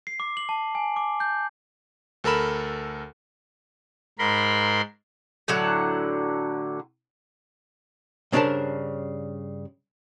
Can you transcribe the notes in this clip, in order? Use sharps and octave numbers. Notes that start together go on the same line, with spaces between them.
C7
D6
F#7
A5
G#5
D6
G6
D2 A4 A#4 B5 E7
G#2 A#4 B5 C6
A2 D3 F#3 F#5
G2 C#3 D4 A#4 C5 A5